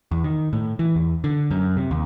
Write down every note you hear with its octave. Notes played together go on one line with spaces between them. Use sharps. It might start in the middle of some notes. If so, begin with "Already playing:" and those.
E2
D#3
A2
E3
E2
D3
F#2
C3
D#2